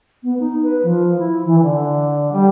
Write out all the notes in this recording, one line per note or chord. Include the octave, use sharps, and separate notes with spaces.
B3
D#4
B4
F3
E4
E3
D3
G3